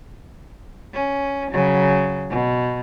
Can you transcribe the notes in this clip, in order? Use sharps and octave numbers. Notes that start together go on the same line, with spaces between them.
C#4
C#3 F#3
B2